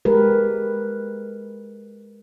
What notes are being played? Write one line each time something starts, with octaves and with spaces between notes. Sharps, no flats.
G#3 G4 A#4 B4